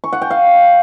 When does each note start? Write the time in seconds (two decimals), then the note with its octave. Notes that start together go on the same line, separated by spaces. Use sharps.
0.04 C#6
0.13 F#5
0.22 G5
0.31 F5